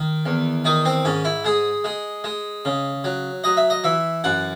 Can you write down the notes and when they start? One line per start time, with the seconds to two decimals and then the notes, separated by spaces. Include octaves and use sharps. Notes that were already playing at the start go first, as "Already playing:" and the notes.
Already playing: D#3
0.26 E2
0.65 D#3 D#4
0.85 C4
1.05 G#2 C#4
1.25 E4
1.44 G#3 G#4
1.84 G#3
2.24 G#3
2.65 C#3
3.04 F#3
3.44 F#3 D#5
3.57 E5
3.70 D#5
3.84 E3 E5
4.24 F#2 F#5